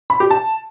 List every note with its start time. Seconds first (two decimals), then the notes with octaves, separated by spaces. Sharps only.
0.10 B5
0.20 G4
0.31 A5